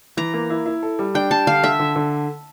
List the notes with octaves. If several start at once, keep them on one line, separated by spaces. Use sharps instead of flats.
E3 A#5
A#3
E4
E4
A4
G3
D4 G5
G3 A5
D3 F5
D3 E5
D3
D3